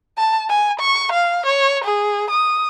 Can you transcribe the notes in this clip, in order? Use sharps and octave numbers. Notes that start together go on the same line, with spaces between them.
A5
G#5
C#6
F5
C#5
G#4
D#6